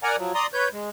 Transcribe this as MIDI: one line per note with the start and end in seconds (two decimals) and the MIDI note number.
0.03 0.16 70
0.03 0.16 74
0.03 0.16 78
0.03 0.16 80
0.03 0.16 82
0.18 0.33 53
0.18 0.33 54
0.35 0.47 74
0.35 0.47 82
0.35 0.47 84
0.35 0.47 87
0.54 0.69 71
0.54 0.69 73
0.54 0.69 91
0.72 0.90 56